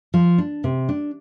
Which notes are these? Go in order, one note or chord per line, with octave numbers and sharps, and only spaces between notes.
F3
D4
C3
D4